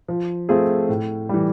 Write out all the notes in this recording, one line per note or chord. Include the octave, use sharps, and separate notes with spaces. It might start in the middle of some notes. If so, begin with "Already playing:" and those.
F3
A3 C4 F4 G#4
A2
E3 G3